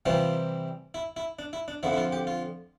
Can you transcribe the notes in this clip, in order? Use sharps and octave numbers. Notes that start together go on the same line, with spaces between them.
C3 E3 G3 C4 F4
E4
E4
D4
E4
D4
F2 D3 F3 E4
E4
F4
G4
F4